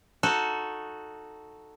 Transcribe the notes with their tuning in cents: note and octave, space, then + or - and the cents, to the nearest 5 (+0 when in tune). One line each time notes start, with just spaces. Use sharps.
D#4 +0 F#4 -10 A4 +0